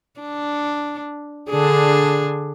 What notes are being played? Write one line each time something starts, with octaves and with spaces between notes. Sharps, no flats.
D4
D3 D4 G#4